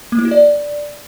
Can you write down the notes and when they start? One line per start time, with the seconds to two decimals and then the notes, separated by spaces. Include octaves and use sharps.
0.12 A#3
0.19 E4
0.25 F#4
0.31 D5